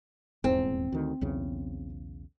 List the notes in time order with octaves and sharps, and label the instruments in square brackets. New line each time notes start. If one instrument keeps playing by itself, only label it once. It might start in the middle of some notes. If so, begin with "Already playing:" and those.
[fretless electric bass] D#1 E2 G#2 [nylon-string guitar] C4
[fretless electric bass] D2 D#3
B1 E2 C#3